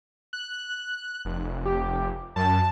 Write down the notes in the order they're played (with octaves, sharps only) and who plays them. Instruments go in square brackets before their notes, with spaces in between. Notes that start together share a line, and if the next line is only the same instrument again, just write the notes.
[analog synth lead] F#6
[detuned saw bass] F1
[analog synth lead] G4
[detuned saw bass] F#2 [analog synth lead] A5